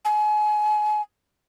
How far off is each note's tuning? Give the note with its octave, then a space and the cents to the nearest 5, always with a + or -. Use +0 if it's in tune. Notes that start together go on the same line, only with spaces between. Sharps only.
G#5 +30